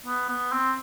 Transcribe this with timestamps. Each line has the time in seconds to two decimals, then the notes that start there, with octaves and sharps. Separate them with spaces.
0.06 B3
0.29 B3
0.52 C4